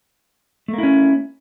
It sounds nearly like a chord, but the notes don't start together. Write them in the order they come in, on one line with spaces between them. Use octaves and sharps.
A3 A#3 E4 C#4